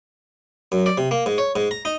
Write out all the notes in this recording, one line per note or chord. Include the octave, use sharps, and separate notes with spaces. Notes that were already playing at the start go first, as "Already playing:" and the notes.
F#2
D5
C3
A#3
G#2
C#5
G#2
A#5
D#4